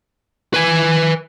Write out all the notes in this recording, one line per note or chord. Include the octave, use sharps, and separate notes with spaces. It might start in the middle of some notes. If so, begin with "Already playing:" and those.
B4 G#5